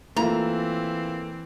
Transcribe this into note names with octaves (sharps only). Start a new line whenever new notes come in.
E3 A3 A#3 C4 E4 F4 A#5